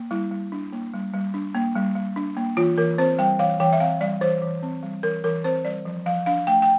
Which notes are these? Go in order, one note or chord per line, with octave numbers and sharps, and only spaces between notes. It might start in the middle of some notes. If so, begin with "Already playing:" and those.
Already playing: A#3
G3 E4
G3
D4
A#3
G3
G3
D4
A#3
G3
G3
D4
A#3
E3 F4
E3 A#4
C4 C5
G3 G5
E3 F5
E3 G5
E5
C4 F5
G3 D5
E3 C5
E3
C4
G3
E3 A#4
E3 A#4
C4 C5
G3 D5
F3
F3 F5
D4 F5
A3 G5
G5